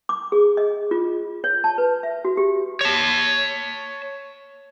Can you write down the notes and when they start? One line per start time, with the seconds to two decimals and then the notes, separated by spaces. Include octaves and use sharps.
0.09 D6
0.32 G#4
0.57 D#5
0.91 F4
1.44 C#5
1.64 A5
1.78 B4
2.03 E5
2.25 F#4
2.37 G4
2.81 C#5 A5